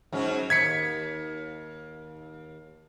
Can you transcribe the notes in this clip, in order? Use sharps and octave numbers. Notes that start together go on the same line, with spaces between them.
G#2 F#3 C#4
D#2 G#6 B6 C#7